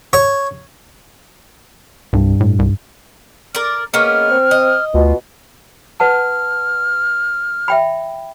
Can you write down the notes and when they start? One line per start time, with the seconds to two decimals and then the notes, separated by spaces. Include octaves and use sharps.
0.13 C#5
2.13 C2 G2
2.40 A2
2.59 C2
3.55 A#4 D5 F6
3.94 G#3 A#3 B3 C#4 F6
4.31 C4
4.51 D#5
4.94 D2 B2 F4
6.00 B4 F#5 A5 F6
7.68 E5 G5 B5